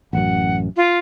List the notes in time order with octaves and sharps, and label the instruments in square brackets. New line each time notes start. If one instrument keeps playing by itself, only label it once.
[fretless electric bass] A1 F#2 [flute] F#5
[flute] F4